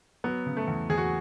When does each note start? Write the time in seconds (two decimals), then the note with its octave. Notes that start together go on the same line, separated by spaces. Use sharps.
0.24 F#3 B3
0.46 C#3
0.57 A3
0.68 E2
0.90 E2 G#4
0.98 F#4